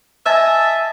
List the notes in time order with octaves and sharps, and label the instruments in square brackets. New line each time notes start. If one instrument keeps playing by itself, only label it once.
[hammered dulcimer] D#5 G#5 A5 [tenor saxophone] E5